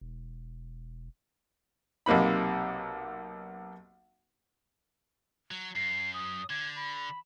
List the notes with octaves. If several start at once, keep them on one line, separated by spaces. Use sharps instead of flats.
E1
B1 C3 A#3 D#4 B5
F#3
F#2 C7
D#6
D3 G#6
B5